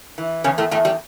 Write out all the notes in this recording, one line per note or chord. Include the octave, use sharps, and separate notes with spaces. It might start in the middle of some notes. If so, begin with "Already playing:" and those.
E3
E2 C#3 C#4
A2 A3
E2 A2 A3
G3